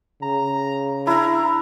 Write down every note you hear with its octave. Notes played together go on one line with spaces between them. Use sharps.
C#3 A#5
D4 E4 A#5